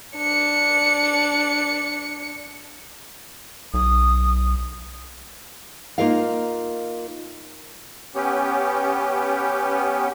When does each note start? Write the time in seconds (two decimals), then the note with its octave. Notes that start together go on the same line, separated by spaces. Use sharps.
0.17 D4 C#7
3.74 B1 D#6
5.98 A#3 D#4 F4 A#4 D#5 F5
8.15 B3 C#4 G4